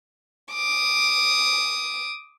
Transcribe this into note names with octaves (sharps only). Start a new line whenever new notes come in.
D6 D#6